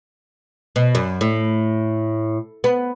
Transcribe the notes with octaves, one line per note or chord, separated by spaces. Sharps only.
B2
F#2
A2
B3